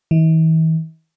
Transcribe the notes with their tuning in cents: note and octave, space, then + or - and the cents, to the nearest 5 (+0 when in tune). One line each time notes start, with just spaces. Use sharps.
E3 -45